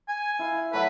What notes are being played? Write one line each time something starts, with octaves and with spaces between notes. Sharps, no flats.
G#5
E4 F5
F#3 A3 B4